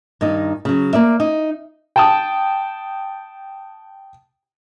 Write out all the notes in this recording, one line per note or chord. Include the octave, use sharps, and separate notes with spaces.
G2 D#3 D#4
C#3 F#3
A#3 D5 E5
D#4
G5 A5 D#6